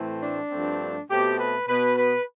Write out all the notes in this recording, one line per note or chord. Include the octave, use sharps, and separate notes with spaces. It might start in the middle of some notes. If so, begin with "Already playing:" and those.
Already playing: A2 E3 A3 C4
D4
G2 F3 A3 C4
B2 A3 C4 G4
B4
B2 B3 B4
B4